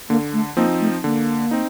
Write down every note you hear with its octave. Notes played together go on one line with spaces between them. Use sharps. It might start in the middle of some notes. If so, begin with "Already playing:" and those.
D3 A#3
A3
F3 A#3 C4 D#4
A3
D3 A#3
C4 D#4